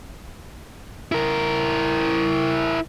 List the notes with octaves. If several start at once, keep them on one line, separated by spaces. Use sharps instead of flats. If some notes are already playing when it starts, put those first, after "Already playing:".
E4 A#4